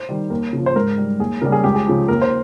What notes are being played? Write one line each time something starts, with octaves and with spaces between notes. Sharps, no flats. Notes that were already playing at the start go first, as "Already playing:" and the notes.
Already playing: C5
D#3 G3
D#2 A#4
C#3 F3
C5
G#2 A#4
G3
D#2 G#4
C#3 G3 A#4
G#4
C#2 G4
G#4
C#3 F3
D#2 A#4
C5